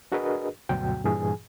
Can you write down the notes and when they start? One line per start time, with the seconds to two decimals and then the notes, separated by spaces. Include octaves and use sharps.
0.12 D4 F#4 G#4 A#4 B4 D#5
0.69 D2 G2 B2 F#3 F#4 G5
1.05 G2 A#2 E3 G#4 G#5